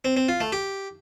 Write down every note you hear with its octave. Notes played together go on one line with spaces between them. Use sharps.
C4
C4
F4
A3
G4